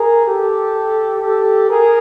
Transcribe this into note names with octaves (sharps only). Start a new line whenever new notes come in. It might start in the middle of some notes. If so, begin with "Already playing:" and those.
Already playing: G#4 A#4
G4 A4
G4 A4
G#4 A#4